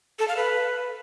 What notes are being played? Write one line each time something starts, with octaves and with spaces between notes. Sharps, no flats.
A4
F5
B4